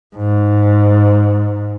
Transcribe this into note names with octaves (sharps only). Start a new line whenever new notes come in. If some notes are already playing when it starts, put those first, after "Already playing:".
G#2